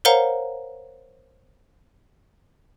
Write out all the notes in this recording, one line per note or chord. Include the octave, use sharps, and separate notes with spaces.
A#4 C5 C#5 F5 F#5 A#5